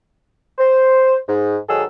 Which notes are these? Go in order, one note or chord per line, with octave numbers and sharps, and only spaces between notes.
C5
G#2
G#2 D#3 F#3 G#4 A4 E6